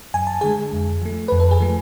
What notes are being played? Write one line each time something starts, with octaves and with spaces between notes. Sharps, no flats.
F#2 G#5
A5
D3 G#3 G#4 G#5
F2
F3 A3
F2 B4
A4
G#4
F3 A3